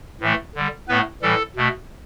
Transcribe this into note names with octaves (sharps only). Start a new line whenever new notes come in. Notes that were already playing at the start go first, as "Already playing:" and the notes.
A2 E3 A3
D3 G3
A2 A3 B3 B4
A2 E3 G3 A4
B2 A3